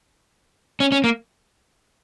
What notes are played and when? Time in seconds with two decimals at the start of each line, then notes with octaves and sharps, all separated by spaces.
0.80 C#4
0.92 C#4
1.04 A#3